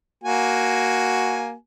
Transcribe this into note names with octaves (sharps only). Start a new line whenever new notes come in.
A#3 F#4 G#5